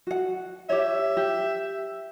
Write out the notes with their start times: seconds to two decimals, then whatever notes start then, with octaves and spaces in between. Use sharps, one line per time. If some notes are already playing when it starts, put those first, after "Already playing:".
0.07 F#4 F#5
0.70 G4 C#5 E5
1.17 G4